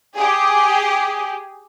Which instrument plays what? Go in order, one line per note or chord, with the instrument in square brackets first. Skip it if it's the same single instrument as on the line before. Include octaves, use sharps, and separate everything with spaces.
[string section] G4 G#4